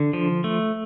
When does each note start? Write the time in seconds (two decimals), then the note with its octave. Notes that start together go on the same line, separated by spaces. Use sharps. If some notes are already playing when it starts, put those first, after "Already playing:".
Already playing: D3
0.13 F3
0.44 A3